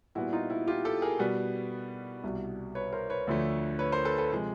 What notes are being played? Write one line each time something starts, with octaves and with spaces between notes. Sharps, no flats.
A#2 G3 B3 E4 F#4
D#4 F4
E4 F#4
F4 G4
G4 A4
G#4 A#4
B2 G3 B3
C2 B2 G3
B4 C#5
A#4 C5
B4 C#5
D2 D3 F3 A3
B4 C#5
A#4 C5
A4 B4
A4 B4
C3 F3 G#3